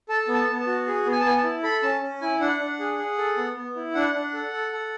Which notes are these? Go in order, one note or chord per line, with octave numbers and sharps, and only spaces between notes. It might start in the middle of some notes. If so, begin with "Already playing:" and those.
A4 A5
B3
A5
B3
A5
F#4
G#4
B3
G#5
A5
B3 G#5
A5
E4
A4 B5
C#4 A5
C#4
E4 G#5
D4 F#5
D4
G#4
G#4
A4
B3
B3
E4
D4 F#5
D4
A4
A4
A4